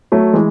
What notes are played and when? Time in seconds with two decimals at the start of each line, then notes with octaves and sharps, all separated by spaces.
0.12 F#3 A3
0.33 E3 G#3